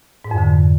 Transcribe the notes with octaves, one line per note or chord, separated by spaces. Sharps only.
G#2
F2
D3